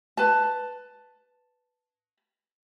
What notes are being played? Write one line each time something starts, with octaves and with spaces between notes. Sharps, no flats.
B4 A5